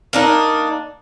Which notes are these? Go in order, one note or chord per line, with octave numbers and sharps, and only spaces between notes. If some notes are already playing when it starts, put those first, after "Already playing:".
A#3 D4 D#4